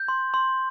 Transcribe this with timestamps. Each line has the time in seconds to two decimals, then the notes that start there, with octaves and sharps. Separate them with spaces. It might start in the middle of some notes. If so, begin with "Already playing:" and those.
Already playing: G6
0.08 C6
0.34 C6